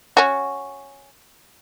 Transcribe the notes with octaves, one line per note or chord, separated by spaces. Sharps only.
C#4 F#4